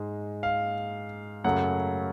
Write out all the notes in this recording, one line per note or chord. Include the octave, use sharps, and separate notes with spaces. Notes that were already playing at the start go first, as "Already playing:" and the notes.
Already playing: G#2 G#3
F5
F#2 C#3 F#3 A3 F#5